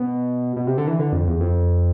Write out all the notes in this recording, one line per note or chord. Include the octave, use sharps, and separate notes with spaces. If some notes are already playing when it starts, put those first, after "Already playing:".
Already playing: B2
B2
C3
D3
E3
D3
F2
E2
F2